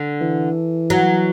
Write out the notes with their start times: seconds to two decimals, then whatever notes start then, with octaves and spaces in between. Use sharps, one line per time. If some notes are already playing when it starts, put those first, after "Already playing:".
Already playing: D3
0.21 E3
0.90 F#3